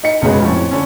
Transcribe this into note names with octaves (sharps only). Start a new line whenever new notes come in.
D#4 C#7
E1 F#2 C#3 F#3 G#3 B3
F2 A2 C#4
D3 C#4